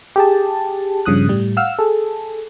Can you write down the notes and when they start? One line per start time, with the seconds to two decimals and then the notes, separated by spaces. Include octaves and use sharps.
0.16 G4 G#4 A5
1.06 G2 C#3 F3 D#6 F#6
1.28 A2 G3
1.57 F5 F#5 E6 F6
1.79 G#4 A4